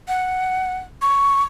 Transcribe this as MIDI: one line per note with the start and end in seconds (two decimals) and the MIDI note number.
0.08 0.76 78
1.02 1.42 85